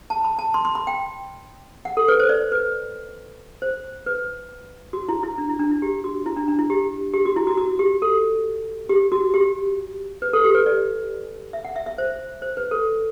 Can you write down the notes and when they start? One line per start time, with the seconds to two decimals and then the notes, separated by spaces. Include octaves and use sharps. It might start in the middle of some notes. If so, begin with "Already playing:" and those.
0.10 A5
0.24 B5
0.39 A5
0.54 C6
0.65 C6
0.75 B5
0.87 G5
1.85 F#5
1.97 A4
2.08 B4
2.19 C5
2.29 D5
2.52 B4
3.62 C5
4.06 B4
4.93 F#4
5.09 E4
5.23 E4
5.38 D4
5.49 E4
5.60 D4
5.71 E4
5.82 G4
6.04 F#4
6.26 E4
6.37 D4
6.48 D4
6.59 E4
6.70 G4
7.14 G4
7.25 F#4
7.36 E4
7.47 F#4
7.57 F#4
7.79 G4
8.02 A4
8.89 G4
9.12 F#4
9.34 G4
10.22 B4
10.33 A4
10.44 G4
10.54 B4
10.66 D5
11.53 E5
11.65 F#5
11.76 E5
11.86 E5
11.98 C5
12.42 C5
12.57 B4
12.71 A4